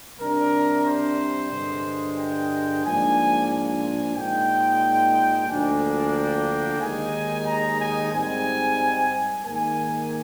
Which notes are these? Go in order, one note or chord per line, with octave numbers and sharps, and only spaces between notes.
C3 G3 D4 A#4
C5
G2 D3 G#3
G5
G#2 F3 A#3 D4 G#5
G#5
A#2 G#3 D#4 G5
D2 D3 F3 A#3 D4 G#5
G5
D#2 D#3 G#3 D#4 G#5
A#5
G#5
G#2 G3 C4 G#5
G#2 D#3 A#3 G#5